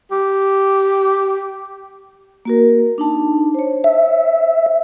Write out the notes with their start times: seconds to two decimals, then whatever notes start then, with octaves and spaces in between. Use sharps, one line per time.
0.11 G4
2.45 A#3 F#4 A#4
2.98 D4 D#4 A5
3.54 C5 C#5
3.84 E5